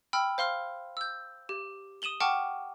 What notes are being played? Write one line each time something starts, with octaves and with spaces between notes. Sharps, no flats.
G5 B5 E6 F6
C5 F5 C6 F6
E6 G6
G4
D#6 D#7 E7 F#7 G7
F#5 G5 A5 C#6 D6 F6